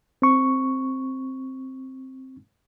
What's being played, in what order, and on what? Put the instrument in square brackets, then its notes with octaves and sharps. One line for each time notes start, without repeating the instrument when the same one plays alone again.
[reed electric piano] C4 C#6